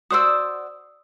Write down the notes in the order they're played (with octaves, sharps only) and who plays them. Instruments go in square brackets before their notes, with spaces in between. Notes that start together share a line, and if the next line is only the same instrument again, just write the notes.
[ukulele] F#4 C5 D5 [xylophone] D#6 E6